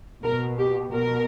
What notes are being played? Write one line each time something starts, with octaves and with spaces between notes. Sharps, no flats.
B2 A#4
G4
B2 A#4